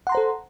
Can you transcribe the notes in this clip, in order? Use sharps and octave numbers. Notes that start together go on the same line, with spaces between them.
A4 C5 F#5 A#5 C6